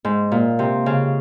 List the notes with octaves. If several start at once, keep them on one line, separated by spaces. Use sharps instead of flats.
G#2
A#2
C3
C#3